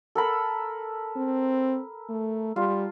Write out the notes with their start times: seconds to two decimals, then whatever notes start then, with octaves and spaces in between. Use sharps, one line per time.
0.15 A4 A#4 B5
1.16 C4
2.09 A3
2.56 G3 F4